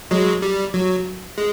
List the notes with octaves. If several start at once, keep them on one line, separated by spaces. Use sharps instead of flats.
F#3 G#3
G3
F#3
G#3